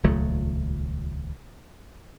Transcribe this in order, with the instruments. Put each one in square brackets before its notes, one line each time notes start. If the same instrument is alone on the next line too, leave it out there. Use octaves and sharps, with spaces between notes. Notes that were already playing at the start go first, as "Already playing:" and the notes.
[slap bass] D#1 C#2 F#3 A3